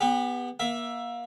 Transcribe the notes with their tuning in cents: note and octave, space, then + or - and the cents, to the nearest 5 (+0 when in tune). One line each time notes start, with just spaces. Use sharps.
B3 +0 G4 +40
A#3 +30 E5 +10